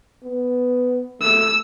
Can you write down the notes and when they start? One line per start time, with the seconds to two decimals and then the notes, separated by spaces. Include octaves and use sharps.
0.24 B3
1.21 A3 E6